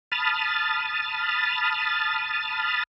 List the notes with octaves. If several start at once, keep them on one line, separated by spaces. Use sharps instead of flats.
A5 B5 D#6 F6 A6